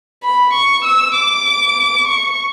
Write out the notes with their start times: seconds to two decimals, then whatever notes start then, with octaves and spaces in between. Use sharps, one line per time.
0.23 B5
0.53 C#6
0.84 E6
1.15 D6
2.07 C#6